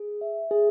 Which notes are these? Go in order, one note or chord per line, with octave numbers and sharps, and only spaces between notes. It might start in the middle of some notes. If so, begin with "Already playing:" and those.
Already playing: G#4
E5
G#4